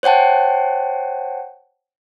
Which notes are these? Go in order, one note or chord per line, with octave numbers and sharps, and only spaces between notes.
C5 C#5 F#5 G5 A5